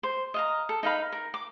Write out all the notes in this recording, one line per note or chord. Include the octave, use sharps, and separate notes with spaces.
C5
D#5 F5 A#5
A4
D#4 B4 F5 B5
A#4
D6